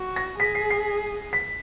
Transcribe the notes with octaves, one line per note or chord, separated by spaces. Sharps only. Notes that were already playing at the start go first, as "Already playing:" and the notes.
Already playing: F#4
A#6
G#4 B6
C7
C7
B6